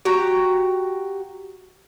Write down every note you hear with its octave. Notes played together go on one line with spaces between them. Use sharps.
F#4 G4 A#5